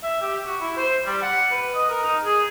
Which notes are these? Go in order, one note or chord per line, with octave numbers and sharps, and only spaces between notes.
E5
G4
F#4
E4
C5
G3
F#5
B4
D#5
A#4
D#4
G#4